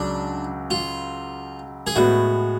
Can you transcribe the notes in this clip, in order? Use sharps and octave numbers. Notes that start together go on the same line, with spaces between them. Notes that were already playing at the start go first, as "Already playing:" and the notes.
Already playing: C#2 C#3 F#3 D4 F#4
F4
G#4
A2 G#3 B3 F#4